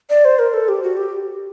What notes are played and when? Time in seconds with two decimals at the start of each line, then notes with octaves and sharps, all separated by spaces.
0.10 D5
0.25 C5
0.39 A#4
0.54 A4
0.69 G4
0.83 F#4
0.97 G4